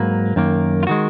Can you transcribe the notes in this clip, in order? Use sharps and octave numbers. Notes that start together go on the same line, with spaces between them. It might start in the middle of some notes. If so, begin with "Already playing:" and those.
Already playing: G#2 F#3 A#3 B4
F#2 D#3 A#3
F4
D#3 G#3 F#4